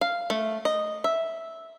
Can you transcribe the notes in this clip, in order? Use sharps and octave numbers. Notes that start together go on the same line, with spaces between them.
F5
A3
D#5
E5